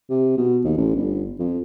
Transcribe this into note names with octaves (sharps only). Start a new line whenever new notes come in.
C3
B2
D#2
A1
G1
F2